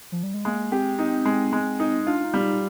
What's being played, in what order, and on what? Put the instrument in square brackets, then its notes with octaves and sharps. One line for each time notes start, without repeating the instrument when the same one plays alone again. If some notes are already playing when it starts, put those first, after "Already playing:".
[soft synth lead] F3
G3
G#3
[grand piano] G#3 [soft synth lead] A#3
[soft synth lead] C4 [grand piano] G4
[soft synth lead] C4 [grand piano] D#4
[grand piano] G#3
G#3
D#4
[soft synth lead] D4 [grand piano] F4
[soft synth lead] D4
D#4
[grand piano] G3
[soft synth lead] D#4